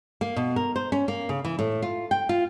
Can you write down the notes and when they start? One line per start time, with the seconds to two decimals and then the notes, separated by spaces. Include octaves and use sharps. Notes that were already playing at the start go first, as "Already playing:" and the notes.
0.21 A#3
0.36 B2
0.56 A#4
0.76 C5
0.92 C#4
1.08 A#3
1.29 C#3
1.45 E3
1.59 A2
1.82 F4
2.11 G5
2.29 F4